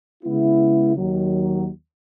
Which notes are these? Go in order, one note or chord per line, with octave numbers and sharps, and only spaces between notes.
C#3 G#3 B3 E4
D#2 D#3 F#3